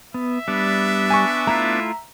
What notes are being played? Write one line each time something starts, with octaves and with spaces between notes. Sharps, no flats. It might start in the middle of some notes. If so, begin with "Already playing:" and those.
B3 E5
G3 B3 D4 A5
G#5 C#6
A3 E4 F4 A#5